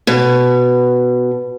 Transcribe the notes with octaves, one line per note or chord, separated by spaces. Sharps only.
B2